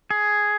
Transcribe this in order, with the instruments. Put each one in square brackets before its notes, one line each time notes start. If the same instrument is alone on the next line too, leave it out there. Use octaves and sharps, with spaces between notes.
[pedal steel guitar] G#4